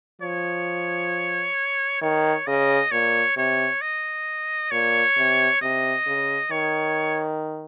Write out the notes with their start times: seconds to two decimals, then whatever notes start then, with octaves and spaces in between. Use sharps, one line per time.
0.22 F3 C#5
2.01 D#3 C#5
2.47 C#3 D#5
2.92 A#2 C#5
3.37 C3 C#5
3.82 D#5
4.71 A#2 C#5
5.17 C3
5.61 C3 D#5
6.07 C#3
6.51 D#3 C#5